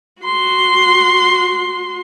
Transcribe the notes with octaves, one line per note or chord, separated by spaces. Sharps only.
F#4 C6